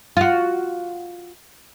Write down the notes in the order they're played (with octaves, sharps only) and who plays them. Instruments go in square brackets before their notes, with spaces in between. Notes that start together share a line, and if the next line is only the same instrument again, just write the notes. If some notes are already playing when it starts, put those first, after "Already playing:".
[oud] F4 F#4